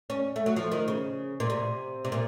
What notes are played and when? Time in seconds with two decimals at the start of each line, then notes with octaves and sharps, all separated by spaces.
0.10 C#4
0.36 A3
0.46 F#3
0.56 F3
0.72 D#3
0.88 C#3
1.40 A#2
1.50 C3
2.05 C3
2.12 A#2